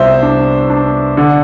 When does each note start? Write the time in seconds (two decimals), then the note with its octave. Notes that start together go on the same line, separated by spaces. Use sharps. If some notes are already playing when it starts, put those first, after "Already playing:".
Already playing: C2 B3 C5 E5
0.23 D4
0.70 D4
1.17 D3